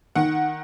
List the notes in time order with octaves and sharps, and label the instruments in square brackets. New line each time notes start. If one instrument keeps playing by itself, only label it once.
[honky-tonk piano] D#3 F#5